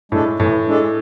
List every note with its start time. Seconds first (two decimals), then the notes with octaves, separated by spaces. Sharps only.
0.12 A2 G#3 D4 A4
0.40 A2 E3
0.67 G#3 D4 A4